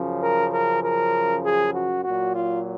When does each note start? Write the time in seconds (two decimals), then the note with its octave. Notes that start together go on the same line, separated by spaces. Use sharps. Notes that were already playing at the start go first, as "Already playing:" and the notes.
Already playing: F#2 C#3 F3
0.23 A#4
0.53 A#4
0.84 A#4
1.44 G#4
1.75 F#4
2.05 A#2 F#3 F#4
2.35 F4